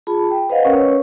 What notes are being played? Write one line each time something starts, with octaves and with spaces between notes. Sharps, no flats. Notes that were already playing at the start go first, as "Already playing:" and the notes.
F4 G#4 A5 B5
G5
B4 C5 D#5 F5 F#5
C#4 A#4 B4 C#5